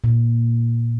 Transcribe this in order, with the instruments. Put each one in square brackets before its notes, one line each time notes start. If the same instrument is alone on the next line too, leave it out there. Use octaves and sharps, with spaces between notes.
[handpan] A#2